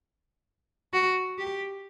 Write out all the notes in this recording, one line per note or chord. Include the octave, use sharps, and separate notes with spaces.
F#4
G4